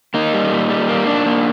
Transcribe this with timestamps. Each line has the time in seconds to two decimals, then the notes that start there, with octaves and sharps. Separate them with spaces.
0.14 A#3 D#4
0.34 G3
0.52 A#2
0.70 G3
0.89 A#3
1.07 D4
1.26 A#3